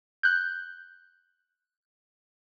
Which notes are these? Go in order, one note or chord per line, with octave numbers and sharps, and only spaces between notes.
F#6 G6